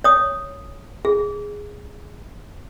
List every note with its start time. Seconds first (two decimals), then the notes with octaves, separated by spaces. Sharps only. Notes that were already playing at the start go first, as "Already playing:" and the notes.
0.04 C#5 D#6
1.05 G#4